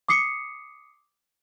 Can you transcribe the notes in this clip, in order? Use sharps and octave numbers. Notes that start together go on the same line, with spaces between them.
D6 D#6 C7 C#7